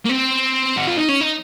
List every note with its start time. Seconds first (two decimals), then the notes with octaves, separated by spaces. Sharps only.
0.06 A#3
0.10 C4
0.77 F#4
0.87 F4
0.97 D#4
1.09 C#4
1.21 D#4